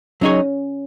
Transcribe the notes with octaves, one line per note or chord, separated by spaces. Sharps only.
F#3 C#4 D#4 G#4 C#5